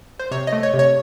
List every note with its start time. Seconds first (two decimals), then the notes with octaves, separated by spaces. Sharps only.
0.19 C5
0.31 C3 C#5
0.47 D#5
0.52 A3
0.63 C#5
0.74 C3
0.79 C#5